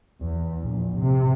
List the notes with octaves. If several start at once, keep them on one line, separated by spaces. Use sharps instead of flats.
E2
A#1
C3